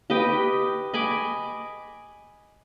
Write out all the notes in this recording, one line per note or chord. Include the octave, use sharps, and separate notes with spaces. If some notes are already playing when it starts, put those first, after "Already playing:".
G4 B4 D#5 G5
D#5 G#5 B5 D6